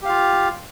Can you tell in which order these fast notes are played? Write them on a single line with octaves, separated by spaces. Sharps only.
G4 F5 F4